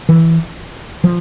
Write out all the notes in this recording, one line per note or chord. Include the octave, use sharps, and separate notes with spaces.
E3
F3